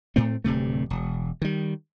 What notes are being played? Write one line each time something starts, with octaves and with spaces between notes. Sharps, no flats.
A2 A3 C4
D1 G2 C3 A3
E1
D#3 G3